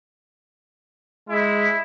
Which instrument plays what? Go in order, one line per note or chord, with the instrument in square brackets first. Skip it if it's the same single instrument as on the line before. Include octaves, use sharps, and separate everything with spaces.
[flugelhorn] G#3 [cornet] E4